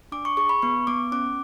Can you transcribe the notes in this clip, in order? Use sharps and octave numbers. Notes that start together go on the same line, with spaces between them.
D4 D6
C#6
G#4 C#6
B5
B3 C#6
B3 D6
C#4 D6